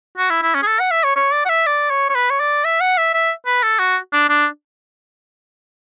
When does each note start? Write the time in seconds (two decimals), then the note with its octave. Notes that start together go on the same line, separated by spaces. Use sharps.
0.17 F#4
0.30 E4
0.43 E4
0.55 C#4
0.62 G#4
0.67 A4
0.80 F#5
0.91 E5
1.04 C#5
1.16 C#5
1.33 D5
1.45 F#5
1.49 E5
1.66 D5
1.91 C#5
2.09 C#5
2.15 B4
2.30 C#5
2.40 D5
2.64 E5
2.81 F#5
2.98 E5
3.14 E5
3.46 B4
3.63 A4
3.79 F#4
4.12 D4
4.29 D4